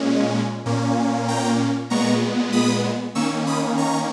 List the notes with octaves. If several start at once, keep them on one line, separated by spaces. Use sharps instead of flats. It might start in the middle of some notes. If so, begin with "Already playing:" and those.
Already playing: A#2 G#3 C#4
A#2 A#3 C#4
G5 A#5
A#2 G#3 B3 A#5 C#6
B5 D#6
D#3 A#3 C#4 C#6 E6
B5 D#6
A#5 C#6